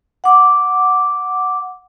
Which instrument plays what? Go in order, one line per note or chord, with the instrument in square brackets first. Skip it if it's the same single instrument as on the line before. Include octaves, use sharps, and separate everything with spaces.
[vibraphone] F#5 D6